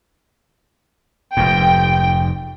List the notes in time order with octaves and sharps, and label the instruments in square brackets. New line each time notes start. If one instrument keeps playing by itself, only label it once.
[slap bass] F1 G#2 [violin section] G5